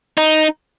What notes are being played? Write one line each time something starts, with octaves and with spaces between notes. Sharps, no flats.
D#4